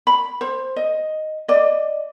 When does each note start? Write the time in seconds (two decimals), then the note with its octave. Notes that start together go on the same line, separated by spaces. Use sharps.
0.07 B5
0.41 C5
0.76 D#5
1.48 D5 D#5